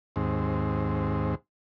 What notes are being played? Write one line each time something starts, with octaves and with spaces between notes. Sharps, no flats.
D#2 G#2 C4